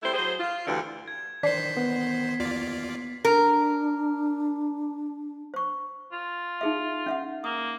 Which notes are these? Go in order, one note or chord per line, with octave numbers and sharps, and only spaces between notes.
G3 A3 E4 C5
F#3 G#4 C5
F4
D2 G2 D3 E3
G#6
D#3 D4 C5 B6 C7
B3
D#2 F4 D5
D4 A#4
C5 C#6
F4
D#4 G#4 E5
C#4 E5 F#5
A#3 D#6